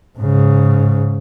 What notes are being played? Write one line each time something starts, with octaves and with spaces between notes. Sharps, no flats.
G#2 C#3